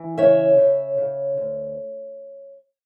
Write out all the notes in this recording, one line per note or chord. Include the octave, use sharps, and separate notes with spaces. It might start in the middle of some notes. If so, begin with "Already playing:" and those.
Already playing: E3
C#3 C#5 E5
C#3
C#3
D2